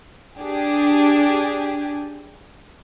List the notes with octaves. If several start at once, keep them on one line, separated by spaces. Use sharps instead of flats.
D4 G4 G#4